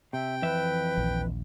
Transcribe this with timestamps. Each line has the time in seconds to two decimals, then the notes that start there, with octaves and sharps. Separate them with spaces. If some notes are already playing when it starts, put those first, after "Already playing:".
0.13 C3 E5 G5
0.42 F2 E3 B4 E5
0.97 A#1 D#2